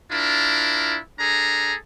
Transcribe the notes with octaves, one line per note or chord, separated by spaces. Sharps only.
D4 E4 F4 A#4
D4 G#4 A4 A#5